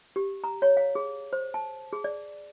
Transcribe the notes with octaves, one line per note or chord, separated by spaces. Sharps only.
G4
A#5
C#5
F5
G#4
C5
A5
G#4
D5